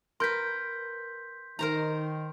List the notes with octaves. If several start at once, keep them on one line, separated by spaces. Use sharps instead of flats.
A#4 B4 C6 G6 B6
D#3 A#4 C5 A#5